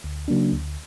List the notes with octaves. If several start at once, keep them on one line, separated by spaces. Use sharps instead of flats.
D2
C#3 F#3 A#3 D4
D2